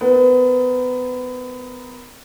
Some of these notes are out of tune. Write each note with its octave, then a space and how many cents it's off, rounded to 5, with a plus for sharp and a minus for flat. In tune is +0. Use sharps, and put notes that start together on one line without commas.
B3 +30 A#4 +30